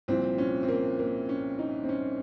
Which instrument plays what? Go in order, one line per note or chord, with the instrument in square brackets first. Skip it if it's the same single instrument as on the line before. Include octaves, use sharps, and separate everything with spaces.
[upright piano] C2 A#2 F3 C4
C#4
C4
A#3
A#3
C#4
D#4
C4
C#4